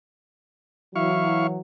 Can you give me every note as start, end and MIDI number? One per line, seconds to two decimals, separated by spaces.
0.95 1.59 52
0.95 1.59 54
0.95 1.47 64
0.95 1.47 77
0.95 1.47 85